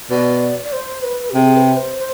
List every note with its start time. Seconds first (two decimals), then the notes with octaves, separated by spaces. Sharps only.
0.11 B2 D5
0.65 D5
0.73 C5
1.03 B4
1.30 G4
1.35 C3 G#4
1.56 B4
1.77 C5
1.98 C5